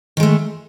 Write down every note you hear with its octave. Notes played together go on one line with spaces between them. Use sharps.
D#3 G#3 A3